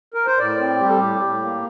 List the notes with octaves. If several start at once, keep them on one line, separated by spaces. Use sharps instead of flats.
A#4
C5
A2 D5
C4
G3 G4
A4
A2 G4
A2
A#3